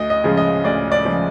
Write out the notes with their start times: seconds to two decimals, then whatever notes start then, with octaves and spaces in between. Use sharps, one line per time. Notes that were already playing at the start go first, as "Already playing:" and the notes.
Already playing: D2 D#5
0.10 D#5
0.24 C#3 F3 G#3
0.37 D#5
0.64 D2 D5
0.92 D5
1.05 C#3 F3 G#3